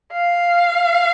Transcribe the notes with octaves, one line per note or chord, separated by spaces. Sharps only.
F5